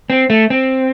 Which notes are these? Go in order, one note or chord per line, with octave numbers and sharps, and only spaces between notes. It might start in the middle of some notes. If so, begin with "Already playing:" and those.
C4
A3
C4